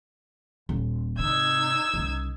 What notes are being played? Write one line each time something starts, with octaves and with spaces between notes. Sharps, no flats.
D#1
G#2 C3 D#4 E6 G#6
C2 C#3